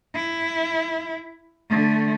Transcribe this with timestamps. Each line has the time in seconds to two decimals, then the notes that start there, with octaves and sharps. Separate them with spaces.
0.15 E4
1.70 D3 A3